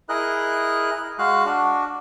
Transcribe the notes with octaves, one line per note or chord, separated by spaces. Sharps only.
E4 G#4 A#4 D#5 F#6
G#3 F#4 F5 F#6
D4 F#4